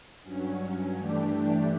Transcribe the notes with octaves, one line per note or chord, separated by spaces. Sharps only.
G2 F#3 C#4
G2 E3 A3 D4 G4